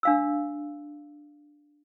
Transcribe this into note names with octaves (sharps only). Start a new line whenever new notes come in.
D4 F5 E6